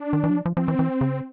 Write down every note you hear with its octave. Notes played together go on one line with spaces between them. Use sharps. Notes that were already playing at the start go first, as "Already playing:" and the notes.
Already playing: D4
D#3
E3
F#3
F3
F3
F3 C4
E3
E3
C#3